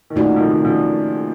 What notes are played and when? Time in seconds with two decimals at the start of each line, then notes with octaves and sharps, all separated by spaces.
0.10 D#3
0.16 A#2 C#3 A3 D#4 F#4
0.36 F3
0.40 C3 D#3
0.65 C#3 F3